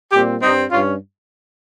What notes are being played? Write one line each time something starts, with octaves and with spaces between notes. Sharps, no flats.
A#2 G3 C4 G4
G2 G3 C4 D#4
G2 G3 C#4 F4